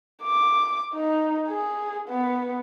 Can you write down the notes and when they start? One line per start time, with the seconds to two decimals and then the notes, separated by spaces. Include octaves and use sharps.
0.23 D6
0.94 D#4
1.48 G#4
2.09 B3